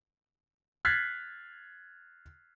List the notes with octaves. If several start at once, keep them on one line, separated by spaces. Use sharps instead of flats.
F6 F#6 G#6 A6 B6 C7